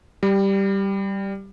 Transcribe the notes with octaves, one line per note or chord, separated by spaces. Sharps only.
G3